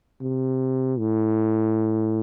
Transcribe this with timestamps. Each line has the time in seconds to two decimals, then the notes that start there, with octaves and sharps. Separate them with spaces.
0.21 C3
0.99 A2